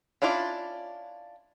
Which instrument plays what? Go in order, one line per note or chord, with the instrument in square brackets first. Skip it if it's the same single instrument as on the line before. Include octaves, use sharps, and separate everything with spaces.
[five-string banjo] C#4 D4 E4 F4 D5